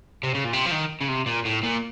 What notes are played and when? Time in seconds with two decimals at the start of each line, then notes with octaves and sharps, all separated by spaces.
0.23 C3
0.34 C#3
0.44 A#2
0.53 C3
0.66 F3
0.71 D#3
1.01 C#3
1.08 C3
1.26 A#2
1.45 A2
1.63 A#2